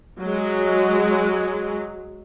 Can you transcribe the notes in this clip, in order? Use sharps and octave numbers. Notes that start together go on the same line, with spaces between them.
F#3 G#3